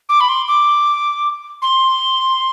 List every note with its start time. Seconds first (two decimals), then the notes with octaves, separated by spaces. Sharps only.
0.09 D6
0.20 B5
0.28 C6
0.47 D6
1.62 C6